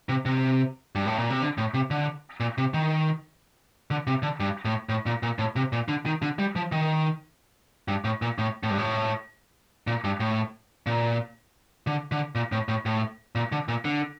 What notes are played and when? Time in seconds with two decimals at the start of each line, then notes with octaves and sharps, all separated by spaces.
0.09 C3
0.26 C3
0.95 G2
1.06 A2
1.18 A#2
1.30 C3
1.42 D3
1.58 A2
1.74 C3
1.91 D3
2.40 A#2
2.58 C3
2.74 D#3
3.91 D3
4.07 C3
4.23 D3
4.40 G2
4.65 A2
4.89 A2
5.06 A#2
5.23 A#2
5.39 A2
5.56 C3
5.73 A#2
5.88 D3
6.06 D#3
6.22 D3
6.39 G3
6.56 F3
6.72 D#3
7.88 G2
8.04 A2
8.22 A#2
8.38 A2
8.63 A2
8.70 G2
8.78 A2
9.87 A#2
10.04 G2
10.20 A2
10.87 A#2
11.87 D3
12.12 D3
12.35 A#2
12.52 A2
12.68 A2
12.86 A2
13.35 A#2
13.52 D3
13.68 A#2
13.85 D3